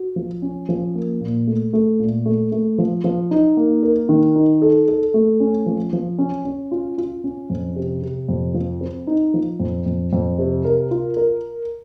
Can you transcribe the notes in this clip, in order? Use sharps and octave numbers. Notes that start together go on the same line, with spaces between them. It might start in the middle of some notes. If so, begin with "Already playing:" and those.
Already playing: F#4
F3
C#4
F3
A#3
A#2
A3
A3
A#2
A3
A3
F3
F3
D#4
A#3
A#4
D#3
D#4
A4
A4
A3
C#4
F3
F3
C#4
C#4
F4
F4
C#4
F2
C3
C3
F2
F3
C4
D#4
F3
F2
F2
F2
C3
A#4
F4
A#4